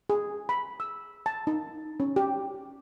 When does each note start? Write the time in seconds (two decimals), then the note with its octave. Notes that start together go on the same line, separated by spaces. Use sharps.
0.10 G#4
0.49 B5
0.80 E6
1.26 A5
1.47 D#4
2.00 C#4
2.16 G4